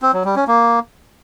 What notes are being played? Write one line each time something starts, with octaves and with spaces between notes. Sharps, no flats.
C4
F#3
G3
C#4
A#3